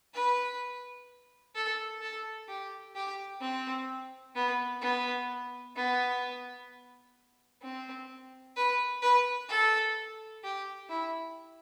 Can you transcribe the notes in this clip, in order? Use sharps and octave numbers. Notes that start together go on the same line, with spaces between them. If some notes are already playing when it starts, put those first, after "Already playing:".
B4
A4
A4
G4
G4
C4
B3
B3
B3
C4
B4
B4
A4
G4
E4